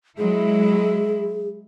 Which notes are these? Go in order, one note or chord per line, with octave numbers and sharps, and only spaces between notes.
F#3 G#3 E4 G#4